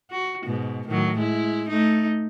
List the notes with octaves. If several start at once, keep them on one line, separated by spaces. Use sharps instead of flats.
F#4
G#2 B2
A2 D#3 F#3
G#3 E4
A3 D#4